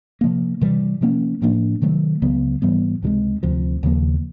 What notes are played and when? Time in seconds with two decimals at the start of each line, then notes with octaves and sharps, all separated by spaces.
0.21 C3 F3 A#3
0.61 C3 E3 G3
1.01 C3 F3 A#3 C#4
1.42 A2 F3 A#3 D4
1.82 C3 D#3 F#3 A3
2.22 C#2 C#3 F#3 B3
2.62 G#2 E3 G3 B3
3.02 C#2 C3 E3 G#3
3.43 D2 C3 F3
3.83 D#2 C#3 F3 A#3